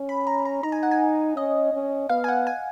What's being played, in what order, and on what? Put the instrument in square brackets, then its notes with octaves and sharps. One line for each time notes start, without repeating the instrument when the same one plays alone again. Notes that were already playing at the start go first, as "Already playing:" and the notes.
Already playing: [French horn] C#4
[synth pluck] B5
A#5
A#5
[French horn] D#4 [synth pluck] A#5
[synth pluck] G#5
F#5
G#5
[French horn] C#4 [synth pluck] D#5
[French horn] C#4
[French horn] B3 [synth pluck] F5
[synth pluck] G#5
F#5
G#5